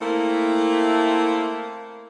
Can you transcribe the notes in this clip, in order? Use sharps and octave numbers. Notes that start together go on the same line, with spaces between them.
A3 A#3 C4 E4